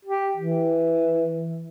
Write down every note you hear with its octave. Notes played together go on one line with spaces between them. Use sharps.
G4
E3